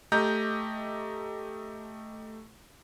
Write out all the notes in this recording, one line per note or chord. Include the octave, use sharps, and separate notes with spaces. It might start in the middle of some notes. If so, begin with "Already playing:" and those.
A3 G4 D#5 A#5 G6